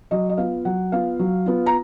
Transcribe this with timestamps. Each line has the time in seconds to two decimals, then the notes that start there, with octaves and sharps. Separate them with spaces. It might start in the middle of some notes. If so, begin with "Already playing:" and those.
0.11 F#3 D#5
0.29 D#5
0.37 B3 F4 F5
0.65 F#3 F#5
0.92 B3 F4 F5
1.19 F#3
1.46 B3 F4
1.66 A#5